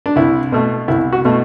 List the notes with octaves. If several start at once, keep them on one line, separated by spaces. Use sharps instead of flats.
D4
C2 E4
B2 A3
C2 E4
F#4
B2 A3